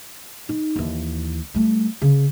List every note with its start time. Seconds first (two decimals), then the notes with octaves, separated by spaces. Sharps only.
0.49 D#4
0.76 D#2 E3
1.54 G3 A3
2.02 C#3